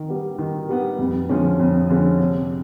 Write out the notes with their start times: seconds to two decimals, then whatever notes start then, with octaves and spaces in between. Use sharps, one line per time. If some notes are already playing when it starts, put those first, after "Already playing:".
Already playing: D#3
0.08 G3 B3
0.38 D#3
0.69 G3 B3
0.99 F2
1.29 D3 F3 G#3 C#4
1.59 F2
1.90 D3 F3 G#3 C#4
2.19 C3